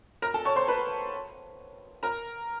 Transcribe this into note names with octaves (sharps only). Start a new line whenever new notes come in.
A#4 A#5
A4 A5
C#5 C#6
C5 C6
B4 B5
A#4 A#5